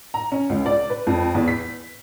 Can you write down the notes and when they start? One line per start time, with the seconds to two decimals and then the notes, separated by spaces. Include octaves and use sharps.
0.14 A#5
0.32 C#4
0.49 C#2
0.66 D5
0.90 B4
1.07 F2
1.35 E2
1.48 B6